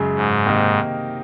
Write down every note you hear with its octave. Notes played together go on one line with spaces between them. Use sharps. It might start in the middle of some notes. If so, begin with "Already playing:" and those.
Already playing: F#2 C#3 G#3
G#2
C3 D#3 A#3 D#4